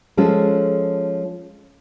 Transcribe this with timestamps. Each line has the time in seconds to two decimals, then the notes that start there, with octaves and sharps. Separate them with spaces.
0.17 F3 G#3 C#4 A4